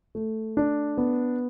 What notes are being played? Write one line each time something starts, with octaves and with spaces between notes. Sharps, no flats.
A3
D4
B3